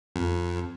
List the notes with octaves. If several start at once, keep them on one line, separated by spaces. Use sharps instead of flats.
F2